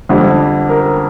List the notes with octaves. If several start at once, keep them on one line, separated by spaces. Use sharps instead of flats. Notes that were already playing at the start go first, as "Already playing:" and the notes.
F2 D3 G3 G4
A#4